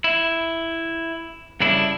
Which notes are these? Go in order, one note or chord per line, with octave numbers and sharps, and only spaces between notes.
E4
G2 C#3 D4 E4